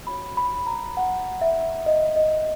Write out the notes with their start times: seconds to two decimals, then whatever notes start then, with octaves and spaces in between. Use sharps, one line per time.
0.06 F#4 C#5 B5
0.37 B5
0.67 A#5
0.97 F#5
1.41 E5
1.86 D#5
2.16 D#5